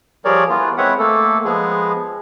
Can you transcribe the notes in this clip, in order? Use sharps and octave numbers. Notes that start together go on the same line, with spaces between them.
F3 G3 G#4 A#4 C#5 D5
E3 B3 F4
G#3 C4 B4 C#5 E5 F#5
A3 A#3 A4
F3 G#3 B3 G#4